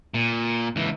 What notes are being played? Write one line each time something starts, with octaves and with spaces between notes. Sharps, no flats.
A#2
C#2 E3